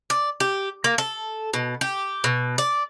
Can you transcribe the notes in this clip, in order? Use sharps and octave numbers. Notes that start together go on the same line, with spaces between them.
D5
G4
A#3
A4
B2
G4
B2
D5